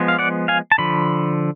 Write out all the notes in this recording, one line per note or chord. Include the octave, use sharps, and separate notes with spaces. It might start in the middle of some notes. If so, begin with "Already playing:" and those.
Already playing: F3 G#3 B3
F5
D5 F#5
F5 G#5
A5
D3 F3 B5